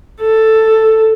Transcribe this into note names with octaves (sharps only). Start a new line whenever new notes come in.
A4